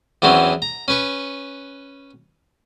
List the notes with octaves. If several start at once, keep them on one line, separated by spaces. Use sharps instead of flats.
E2 E3 F#3 C4 C#4
A#5
C#4 B4 C#6